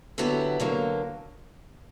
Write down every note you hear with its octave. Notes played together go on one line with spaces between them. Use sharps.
D3 F#3 B3 E4 G4
D3 F#3 A#3